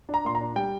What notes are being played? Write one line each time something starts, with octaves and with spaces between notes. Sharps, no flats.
D4
A#5
A#2 C6
A#5
D4
G3 G5